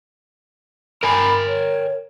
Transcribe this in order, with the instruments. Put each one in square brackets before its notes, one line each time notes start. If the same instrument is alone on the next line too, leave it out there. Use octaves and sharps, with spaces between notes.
[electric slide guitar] A#4 G5 G#5 [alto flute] B5
[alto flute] C#5